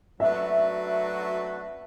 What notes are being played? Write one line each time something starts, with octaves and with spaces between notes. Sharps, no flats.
F#3 A3 D4 F#4 B4 E5